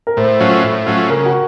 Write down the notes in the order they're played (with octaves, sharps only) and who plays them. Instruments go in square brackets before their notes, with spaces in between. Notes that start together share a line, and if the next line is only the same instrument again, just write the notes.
[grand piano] A#4
[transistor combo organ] A2 [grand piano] C5
[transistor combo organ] F#3 A3 C#4 F4
A2
F#3 A3 C#4 F4
[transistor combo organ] C#3 [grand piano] A#4
[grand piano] F#4